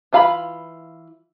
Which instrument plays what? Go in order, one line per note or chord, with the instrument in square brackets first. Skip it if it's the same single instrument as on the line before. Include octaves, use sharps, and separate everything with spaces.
[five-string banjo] E3 F4 F5 A#5 B5